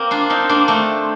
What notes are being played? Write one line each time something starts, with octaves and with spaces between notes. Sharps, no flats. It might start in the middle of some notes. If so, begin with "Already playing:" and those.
Already playing: A#3 C4
D4 F4
C4 D#4
A#3 D4
A3 C4